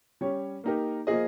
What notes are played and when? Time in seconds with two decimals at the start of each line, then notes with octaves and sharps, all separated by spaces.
0.21 G3 C#4 G4 C#5
0.64 A#3 D#4 G4 A#4
1.07 F3 A#3 F4 G#4 D#5